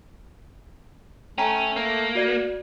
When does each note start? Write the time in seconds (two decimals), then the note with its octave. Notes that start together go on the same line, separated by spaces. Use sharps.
1.38 A3 C#4 G5 A5 A#5
1.76 A#3
2.15 F#4 D5 G#6